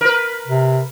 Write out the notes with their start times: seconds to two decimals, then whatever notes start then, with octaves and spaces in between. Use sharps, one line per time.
0.01 A#4 B4
0.48 C3